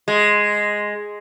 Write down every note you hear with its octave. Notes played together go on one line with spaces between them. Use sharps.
G#3